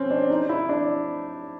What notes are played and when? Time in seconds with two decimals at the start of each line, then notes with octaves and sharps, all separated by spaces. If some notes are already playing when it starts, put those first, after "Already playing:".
Already playing: C4 C#4
0.11 D4
0.30 D#4
0.49 E4
0.69 D4